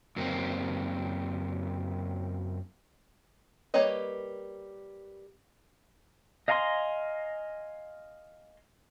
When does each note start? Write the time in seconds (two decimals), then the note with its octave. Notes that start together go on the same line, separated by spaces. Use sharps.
0.16 F#2 A#3 C4
3.74 G3 A#3 B4 C#5 D#5
6.48 D#5 F5 G#5 A#5 C6